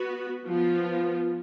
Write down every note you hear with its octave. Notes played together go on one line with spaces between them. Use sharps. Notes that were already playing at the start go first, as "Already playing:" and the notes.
Already playing: B3 F#4 B4
F3 B3 F4